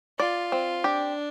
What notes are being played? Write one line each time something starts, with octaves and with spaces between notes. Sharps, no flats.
F4 D5
C4
D4 G4